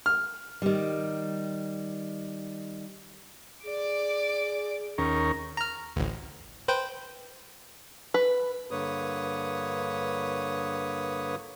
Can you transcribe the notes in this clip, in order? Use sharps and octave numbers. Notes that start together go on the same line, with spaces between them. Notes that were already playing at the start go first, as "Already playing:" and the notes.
F6
D#3 G3
G#4 D5 D6
D#2 C#4 A#4
A#5 F6
A1 D2
B4 C5 G5
B4
G2 D3 A#3 B4 C#5 D#6